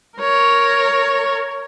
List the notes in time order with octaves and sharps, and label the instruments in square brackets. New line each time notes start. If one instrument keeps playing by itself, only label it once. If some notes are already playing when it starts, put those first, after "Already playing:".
[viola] A#4 C#5